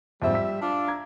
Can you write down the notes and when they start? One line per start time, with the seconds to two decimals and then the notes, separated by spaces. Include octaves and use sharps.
0.22 F2 G#2 G3 C4 E5
0.34 E6 B6
0.61 D4 F4
0.88 A#5 G#6